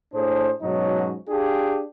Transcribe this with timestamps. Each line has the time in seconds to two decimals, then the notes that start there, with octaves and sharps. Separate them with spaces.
0.13 A2 D4 G#4 C5
0.62 G#2 B2 F#3 C#4 D#4
1.28 D4 F4 G4 G#4